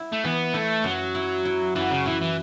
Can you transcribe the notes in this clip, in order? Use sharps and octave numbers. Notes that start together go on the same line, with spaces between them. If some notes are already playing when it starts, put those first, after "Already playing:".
Already playing: E4
A3
E3 B3
A3 E4
F#2 F#3
E4
E4
F#2 E3
C#3
E3 E4
E3